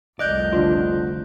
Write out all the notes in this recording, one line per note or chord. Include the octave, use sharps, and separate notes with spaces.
F1 C2 D5 D#5 F#6 G6
D3 D4 F4 C5